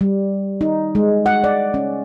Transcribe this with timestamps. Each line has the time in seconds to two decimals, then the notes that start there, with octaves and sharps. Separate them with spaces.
0.01 G3
0.61 D#4
0.95 G#3
1.26 F#5
1.44 D5
1.74 C#4